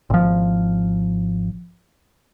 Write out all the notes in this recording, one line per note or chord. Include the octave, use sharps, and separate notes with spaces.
G#1 F3